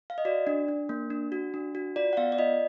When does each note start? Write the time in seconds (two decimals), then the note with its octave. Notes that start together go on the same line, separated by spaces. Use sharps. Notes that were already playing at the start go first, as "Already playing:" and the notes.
0.10 F5
0.18 D#5
0.25 F#4 D5
0.47 D4
0.68 D4
0.89 A#3
1.10 D4
1.32 F#4
1.54 D4
1.75 F#4
1.96 F4 D5
2.13 F#5
2.17 B3 F5
2.32 D5
2.38 F4 D#5